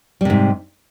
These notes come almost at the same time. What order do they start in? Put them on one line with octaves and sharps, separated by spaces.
G3 C3 G#2